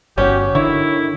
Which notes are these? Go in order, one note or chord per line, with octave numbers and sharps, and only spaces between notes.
G1 C#4 F#4 G4
D3 D#3 E4 C#5